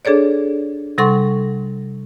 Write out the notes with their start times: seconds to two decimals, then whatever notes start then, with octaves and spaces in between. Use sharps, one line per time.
0.05 D4 G#4 A4 C#5 D5
0.98 C3 G3 A4 F#5 C6 C#6